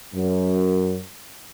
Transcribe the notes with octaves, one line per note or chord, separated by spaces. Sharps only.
F#2